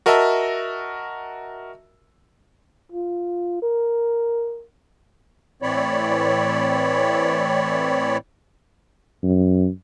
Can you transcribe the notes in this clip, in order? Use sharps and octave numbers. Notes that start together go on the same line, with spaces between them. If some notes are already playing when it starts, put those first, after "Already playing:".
F#4 A#4 D#5 E5 A5 E6
F4
A#4
A2 E3 C4 C#5 D5 B5
F#2